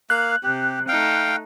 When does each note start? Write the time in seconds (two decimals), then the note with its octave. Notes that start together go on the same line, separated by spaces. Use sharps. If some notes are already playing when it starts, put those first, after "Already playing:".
0.10 A#3 F5 F#6
0.43 C3 G4
0.88 A3 D#4 F5 G5